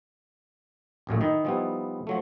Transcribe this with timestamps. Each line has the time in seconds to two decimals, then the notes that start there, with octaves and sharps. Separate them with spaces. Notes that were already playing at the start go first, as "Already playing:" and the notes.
1.07 A1 F#2 A#2 A3
1.21 D#3 D#4 E4
1.45 F3 G3 B3 D#4 E4
2.07 F3 F#3 A3